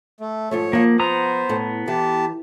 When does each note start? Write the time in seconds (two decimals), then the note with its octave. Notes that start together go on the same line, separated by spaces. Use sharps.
0.20 A3
0.51 G#2 F3 A3 C#5
0.73 F3 A#3 F#5
1.00 B3 C5 A#5 D#6
1.49 A2
1.88 E3 G4 A5